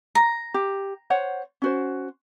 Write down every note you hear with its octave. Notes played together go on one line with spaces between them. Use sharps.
A#5
G4
C5 C#5 F#5
C#4 F#4 C5